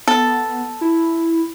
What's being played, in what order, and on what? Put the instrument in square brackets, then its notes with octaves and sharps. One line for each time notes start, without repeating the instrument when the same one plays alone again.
[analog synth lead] B3 [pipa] A4
[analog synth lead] E4